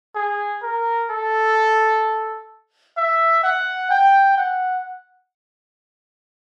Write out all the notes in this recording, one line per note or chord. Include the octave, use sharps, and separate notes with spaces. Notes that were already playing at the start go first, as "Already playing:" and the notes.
G#4
A#4
A4
E5
F#5
G5
F#5